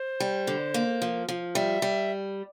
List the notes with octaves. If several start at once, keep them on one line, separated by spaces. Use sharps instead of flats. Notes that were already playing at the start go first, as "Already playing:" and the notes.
Already playing: C5
G3
D3
A#3
F3
F3
G3 E5
G3